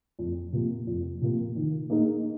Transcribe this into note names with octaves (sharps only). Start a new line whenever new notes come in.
F2
C3 F3 A#3
F2
C3 F3 A#3
D#3
A#3 D#4 G#4 D#5